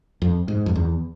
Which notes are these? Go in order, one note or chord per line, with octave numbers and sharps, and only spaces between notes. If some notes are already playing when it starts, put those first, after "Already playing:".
F2
G#2
F2
E2